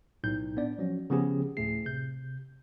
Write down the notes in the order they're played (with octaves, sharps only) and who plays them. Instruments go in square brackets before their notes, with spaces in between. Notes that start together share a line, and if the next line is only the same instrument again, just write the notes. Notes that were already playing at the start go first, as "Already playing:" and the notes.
[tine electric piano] B1 A2 D#4 G6
B3 D4 D5
F3 F#3 C#4
C#3 F3 B3 C#4 G4 G#4
D2 A2 A3 G#4 C7
C3 G6